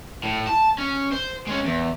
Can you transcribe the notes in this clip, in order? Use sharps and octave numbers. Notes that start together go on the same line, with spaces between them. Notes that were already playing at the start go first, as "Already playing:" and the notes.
A2
A5
C#4
C5
G#3 C#4
E2